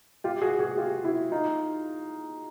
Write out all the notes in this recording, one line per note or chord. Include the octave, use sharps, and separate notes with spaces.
F4 G4
F#4 G#4
F#4 G#4
F4 G4
E4 F#4
D#4 F4